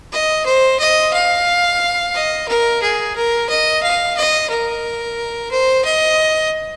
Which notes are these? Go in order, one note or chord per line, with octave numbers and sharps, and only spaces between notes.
D#5
C5
D#5
F5
D#5
A#4
G#4
A#4
D#5
F5
D#5
A#4
C5
D#5